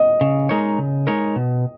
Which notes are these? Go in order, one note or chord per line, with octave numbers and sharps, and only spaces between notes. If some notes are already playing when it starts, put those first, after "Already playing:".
Already playing: D#5
C#3
G#3 D#4 A#4 C#5
C#3
G#3 D#4 A#4 C#5
B2